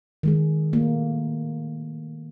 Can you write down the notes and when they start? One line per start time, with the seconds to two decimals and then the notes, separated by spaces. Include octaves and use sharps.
0.23 D#3 G#3 G#4
0.73 A3 A#3